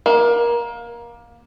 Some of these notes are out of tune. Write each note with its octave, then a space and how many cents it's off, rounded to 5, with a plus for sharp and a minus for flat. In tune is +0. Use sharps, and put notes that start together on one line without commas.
A#3 +20